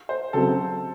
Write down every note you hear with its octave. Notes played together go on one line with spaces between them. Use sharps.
C5
C#3 F#3 C4 A4